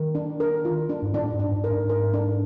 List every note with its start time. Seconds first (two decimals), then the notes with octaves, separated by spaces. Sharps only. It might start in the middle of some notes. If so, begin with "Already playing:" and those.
Already playing: D#3 A#4
0.15 D4
0.40 A#4
0.65 F4
0.90 D4
1.02 G#2
1.14 A2 D4
1.34 G#2
1.40 D4
1.51 G#2
1.64 A#4
1.70 G#2
1.89 A#4
2.14 D4